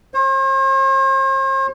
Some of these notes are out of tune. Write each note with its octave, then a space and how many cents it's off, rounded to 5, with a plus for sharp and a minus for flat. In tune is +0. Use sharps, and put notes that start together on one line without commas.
C5 +45